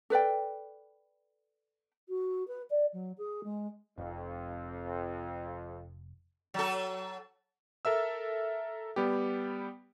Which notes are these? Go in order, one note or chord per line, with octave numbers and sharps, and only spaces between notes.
A4 B4 D5 G5
F#4
B4
D5
F#3
G#4
G#3
F1 F2
F#3 A4
A4 A#4 E5 E6
G3 B3 G4